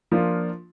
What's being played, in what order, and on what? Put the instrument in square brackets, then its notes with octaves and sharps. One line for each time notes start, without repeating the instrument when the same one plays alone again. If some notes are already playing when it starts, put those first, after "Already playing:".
[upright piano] F3 A#3 D4 F4